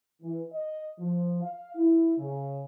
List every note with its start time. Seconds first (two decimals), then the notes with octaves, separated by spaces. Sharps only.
0.22 E3
0.52 D#5
0.99 F3
1.42 F5
1.75 E4
2.18 C#3